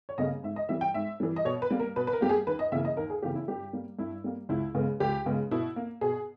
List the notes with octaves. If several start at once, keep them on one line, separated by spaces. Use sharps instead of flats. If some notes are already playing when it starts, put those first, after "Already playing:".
C#5
C#3 G3 A#3 D#5
G#2 E5
D#5
E3 G3 E5
G5
G#2 E5
E3 G3
D#5
B2 C#5
B4
G3 A#3
A#4
B2 B4
B4
A#4
G3 A#3 G4
G#4
D#2 B4
D#5
C#3 E3 A#3 E5
D#5
D#2 A#4
G#4
C#3 E3 A#3 G4
E4
G2 G4
G3 A#3
G2 E4
G3 A#3
C#2 E4
C#3 G#3 B3
C#2 G4
C#3 G#3 B3
B2 E4
A#3
B2 G#4